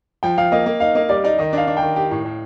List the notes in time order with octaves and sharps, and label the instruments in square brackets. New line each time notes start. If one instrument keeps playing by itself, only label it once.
[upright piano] F3 [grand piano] G5
[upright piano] F3 [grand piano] F5
[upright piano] A#3 [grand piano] D#5
[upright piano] A#3
[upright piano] D#4 [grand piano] F5
[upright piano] A#3 [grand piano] D#5
[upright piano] G3 [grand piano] D5
[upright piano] D#4 [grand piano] D5
[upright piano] D#3 [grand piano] D#5
[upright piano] D4 [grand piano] F5
[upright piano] D4
[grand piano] G5
[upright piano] D#3
G4
A2
A2